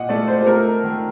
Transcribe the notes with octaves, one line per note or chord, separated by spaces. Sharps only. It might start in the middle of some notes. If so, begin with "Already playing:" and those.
Already playing: A#2 D#5 F#5
A3 D5
C5
A4
A3 A#4
D#3